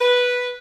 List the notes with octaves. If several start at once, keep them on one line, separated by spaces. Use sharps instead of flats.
B4